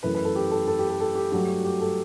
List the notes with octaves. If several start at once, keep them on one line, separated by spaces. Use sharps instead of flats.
F#2 E3 A3 B4
B4
A4
G4
A4
A4
G4
A4
A4
G4
G2 F#3 A3 G4
F#4
G4
A4